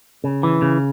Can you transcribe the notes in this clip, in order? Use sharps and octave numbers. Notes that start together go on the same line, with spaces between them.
C#3
E3
C#3